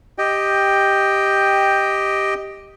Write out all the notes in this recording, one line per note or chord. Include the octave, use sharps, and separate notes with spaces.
G4 D#5 G5